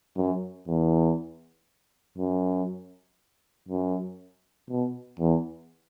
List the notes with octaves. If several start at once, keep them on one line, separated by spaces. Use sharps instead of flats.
F#2
E2
F#2
F#2
B2
E2